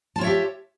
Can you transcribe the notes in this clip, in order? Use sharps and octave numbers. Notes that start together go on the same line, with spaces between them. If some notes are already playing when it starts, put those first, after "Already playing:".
F4 G4 C#5 E5 A5